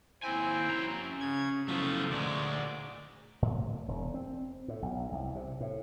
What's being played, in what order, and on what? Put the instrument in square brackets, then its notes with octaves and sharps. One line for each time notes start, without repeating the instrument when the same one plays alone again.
[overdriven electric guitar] D#2 G#5 [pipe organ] C4 E4 G5
[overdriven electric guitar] C#4 A#5
[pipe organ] C#3 G#6
[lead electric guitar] C#3 F#3 [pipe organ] F3 [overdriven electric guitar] A3 B3
[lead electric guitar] D2 [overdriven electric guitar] A#2 G#3 [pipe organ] D5
[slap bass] A2
E1
C4
A2
B1
C2
C3
A2